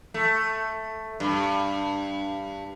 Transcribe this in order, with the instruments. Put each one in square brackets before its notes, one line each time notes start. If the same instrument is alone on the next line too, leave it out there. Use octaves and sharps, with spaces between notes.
[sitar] A3
G2